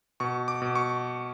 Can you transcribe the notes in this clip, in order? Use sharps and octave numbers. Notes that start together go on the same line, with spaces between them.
B2 C#6
D6
B2
C#6